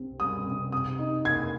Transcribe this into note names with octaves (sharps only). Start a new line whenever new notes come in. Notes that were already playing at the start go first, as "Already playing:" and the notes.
Already playing: C2 C3 C4
G3 D#6
C3
C3 D#6
D#4
A#3 G#6